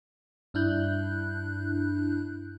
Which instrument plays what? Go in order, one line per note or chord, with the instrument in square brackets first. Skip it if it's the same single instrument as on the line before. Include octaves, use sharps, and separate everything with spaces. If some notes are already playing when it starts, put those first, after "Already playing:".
[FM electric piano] G2 D4 E4 F#6 G6